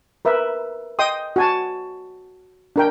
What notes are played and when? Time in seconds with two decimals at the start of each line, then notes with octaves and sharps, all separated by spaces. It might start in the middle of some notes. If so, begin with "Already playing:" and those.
0.25 A#4 B4 E5
0.99 D#5 G5 C6 D#6
1.36 F#4 G#5 A5
2.76 D4 A#4 G5